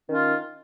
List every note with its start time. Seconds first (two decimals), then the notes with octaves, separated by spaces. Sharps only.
0.06 D#3
0.10 C#4
0.14 F4